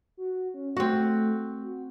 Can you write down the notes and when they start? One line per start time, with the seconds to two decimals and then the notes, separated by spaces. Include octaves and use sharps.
0.17 F#4
0.54 C#4
0.77 A3 C4 F#4
1.63 F#4